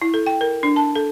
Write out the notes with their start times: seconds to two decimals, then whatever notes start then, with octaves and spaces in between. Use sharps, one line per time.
0.02 E4
0.14 A4
0.26 G5
0.41 A#4
0.63 D4
0.76 A5
0.95 A4